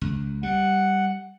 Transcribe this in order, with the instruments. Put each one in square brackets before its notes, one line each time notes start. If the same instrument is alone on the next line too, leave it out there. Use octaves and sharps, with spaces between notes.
[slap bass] C#2
[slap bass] G3 [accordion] F#5